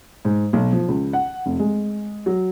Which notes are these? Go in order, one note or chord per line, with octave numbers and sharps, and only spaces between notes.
G#2
B1
F3
C#2
F#5
F1
G#3
F#3